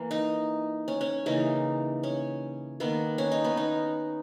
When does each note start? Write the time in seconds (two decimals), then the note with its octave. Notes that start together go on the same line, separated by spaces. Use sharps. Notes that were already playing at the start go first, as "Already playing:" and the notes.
Already playing: E3 A#3
0.11 D#4
0.88 C#4
1.01 C#4
1.26 C#3 E3 A#3 D#4
2.03 C#4
2.80 D#3 A#3 B3
3.18 C#4
3.32 D#4
3.44 B3
3.57 D#4